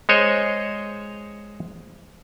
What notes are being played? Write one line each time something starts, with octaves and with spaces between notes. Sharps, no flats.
G#3 C5 C#5 D#5